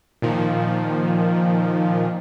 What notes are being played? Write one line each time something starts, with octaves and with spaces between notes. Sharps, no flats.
A#2 D#3 F3